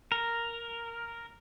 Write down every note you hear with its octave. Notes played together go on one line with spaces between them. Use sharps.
A#4